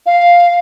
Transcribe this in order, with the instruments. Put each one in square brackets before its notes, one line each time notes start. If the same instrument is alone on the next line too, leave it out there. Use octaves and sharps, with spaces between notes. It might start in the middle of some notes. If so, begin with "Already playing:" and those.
[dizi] F5